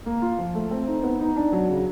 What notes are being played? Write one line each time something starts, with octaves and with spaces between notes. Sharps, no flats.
A#3
F4
F3
A3
C4
D#4
B3
D#4
D4
F#3
C#3